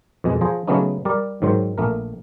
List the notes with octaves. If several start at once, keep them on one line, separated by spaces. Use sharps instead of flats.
F2 B2 G#3
F3 G#4 C5 A#5
C#3 F#3 A3 B3 C#4 D#4
G3 A#4 D5
G#2 D#3 F#3 C5
A#1 A3 A#4